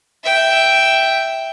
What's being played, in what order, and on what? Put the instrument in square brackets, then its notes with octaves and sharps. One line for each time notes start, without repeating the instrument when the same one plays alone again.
[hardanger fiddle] E5 G5